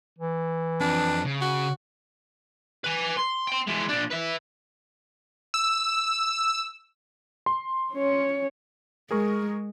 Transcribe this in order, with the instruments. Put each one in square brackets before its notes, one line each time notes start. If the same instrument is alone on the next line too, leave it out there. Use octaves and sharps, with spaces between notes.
[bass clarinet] E3
[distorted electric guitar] F2 [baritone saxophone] D4
[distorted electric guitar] C#3
[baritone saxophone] F#4
[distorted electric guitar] B4 G#5
C6
G5 C6
E3 G#3
A#2 D4
B4 E5
[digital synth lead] E6
[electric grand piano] C6
[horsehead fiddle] C#4 C#5
[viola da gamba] G#3 [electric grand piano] G#4 A#4 C#6